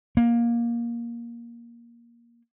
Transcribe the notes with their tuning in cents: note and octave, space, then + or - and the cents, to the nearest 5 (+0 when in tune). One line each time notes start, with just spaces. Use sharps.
A#3 +15